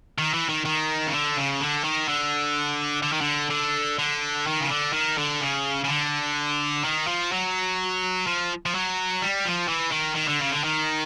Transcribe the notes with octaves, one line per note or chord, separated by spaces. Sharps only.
D#3
E3
D#3
D#3
C#3
D3
C#3
D3
D#3
D3
D3
D#3
D3
D3
D3
D#3
C#3
D3
D#3
D3
C#3
C#3
D3
D#3
F3
F#3
F3
F3
F#3
G3
F3
E3
D#3
D#3
D3
C#3
D3
D#3